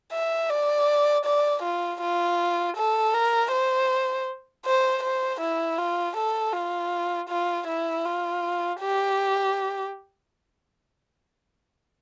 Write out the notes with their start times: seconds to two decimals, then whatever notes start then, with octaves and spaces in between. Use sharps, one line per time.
0.13 E5
0.50 D5
1.25 D5
1.63 F4
2.01 F4
2.77 A4
3.14 A#4
3.52 C5
4.65 C5
5.03 C5
5.41 E4
5.78 F4
6.16 A4
6.53 F4
7.29 F4
7.67 E4
8.05 F4
8.80 G4